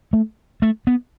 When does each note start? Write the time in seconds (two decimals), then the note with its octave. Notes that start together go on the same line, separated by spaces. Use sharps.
0.13 A3
0.62 A3
0.87 B3